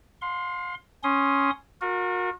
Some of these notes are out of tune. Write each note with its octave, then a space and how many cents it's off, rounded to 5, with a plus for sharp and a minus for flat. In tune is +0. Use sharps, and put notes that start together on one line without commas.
F5 +35 C6 +0
C#4 +0 C6 +0 D#6 +0
F#4 -40 A#4 +0